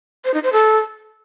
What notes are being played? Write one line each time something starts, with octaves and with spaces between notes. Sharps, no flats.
C5
D#4
C5
A4